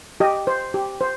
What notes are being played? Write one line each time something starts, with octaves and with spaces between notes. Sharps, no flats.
G4 D#5
C5
G4
C5